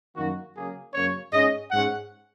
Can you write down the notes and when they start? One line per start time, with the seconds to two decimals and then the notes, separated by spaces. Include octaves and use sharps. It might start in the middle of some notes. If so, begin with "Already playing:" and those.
0.16 F#2 D#3 A#3 D#4 F#4
0.55 C#3 F#3 A#3 G#4
0.94 F#2 C#3 A#3 C#4 C#5
1.33 G#2 G#3 C#4 D#5
1.71 G#2 G#3 C#4 F#5